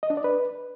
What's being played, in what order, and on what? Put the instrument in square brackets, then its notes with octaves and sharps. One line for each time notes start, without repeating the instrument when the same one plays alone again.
[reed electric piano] D#5
D4
D5
B4